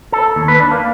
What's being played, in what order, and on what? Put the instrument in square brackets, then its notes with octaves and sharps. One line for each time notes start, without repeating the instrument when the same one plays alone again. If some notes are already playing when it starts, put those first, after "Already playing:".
[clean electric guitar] A4
D#2
B4
D4
A#3